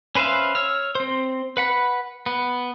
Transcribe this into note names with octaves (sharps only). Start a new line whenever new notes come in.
C#4 B4 C5 E5 F5
C#5 E6 F6
C4 C5
B4 F#5 B5
B3